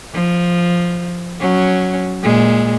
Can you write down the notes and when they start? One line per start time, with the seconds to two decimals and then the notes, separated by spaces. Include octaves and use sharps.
0.14 F3
1.40 F#3 C#4
2.22 A#2 G#3